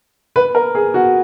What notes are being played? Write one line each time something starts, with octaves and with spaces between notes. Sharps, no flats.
B4
A#4
G#4
F#4